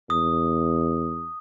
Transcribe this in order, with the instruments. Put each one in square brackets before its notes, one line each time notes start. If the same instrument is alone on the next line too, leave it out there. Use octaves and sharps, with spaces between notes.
[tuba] E2 [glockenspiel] D#6